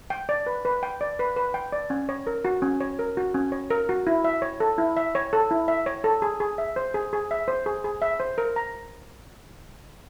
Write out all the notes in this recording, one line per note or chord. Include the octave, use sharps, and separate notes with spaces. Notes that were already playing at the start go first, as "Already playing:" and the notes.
G5
D5
B4
B4
G5
D5
B4
B4
G5
D5
C#4
C#5
A#4
F#4
C#4
C#5
A#4
F#4
C#4
C#5
A#4
F#4
E4
E5
C#5
A4
E4
E5
C#5
A4
E4
E5
C#5
A4
G#4
G#4
E5
C5
G#4
G#4
E5
C5
G#4
G#4
E5
C5
A#4
A#5